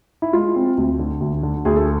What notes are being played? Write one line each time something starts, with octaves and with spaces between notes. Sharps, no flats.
E4
G#3 F4
C4
D2
D3
D2
D3
D2 G#4
A4